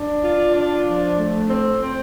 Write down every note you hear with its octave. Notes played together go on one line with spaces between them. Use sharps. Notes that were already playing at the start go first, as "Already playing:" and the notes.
Already playing: D4
F4
D4
F3
A3
C4
C4